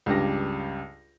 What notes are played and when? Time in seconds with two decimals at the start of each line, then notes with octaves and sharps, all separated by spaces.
0.06 C#2 G2 C#3 G4 A#6